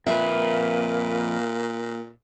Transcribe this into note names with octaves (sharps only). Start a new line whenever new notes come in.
F2 A#2 A#3 B4 E5 F5